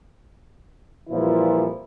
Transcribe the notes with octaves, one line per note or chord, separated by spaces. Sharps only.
F2 A#2 E3 F3 G3 E4